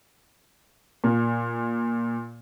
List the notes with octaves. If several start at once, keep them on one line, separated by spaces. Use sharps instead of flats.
A#2